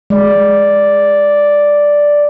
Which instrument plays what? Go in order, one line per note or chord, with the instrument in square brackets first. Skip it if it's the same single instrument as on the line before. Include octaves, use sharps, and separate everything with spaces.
[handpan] G#3 [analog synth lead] D5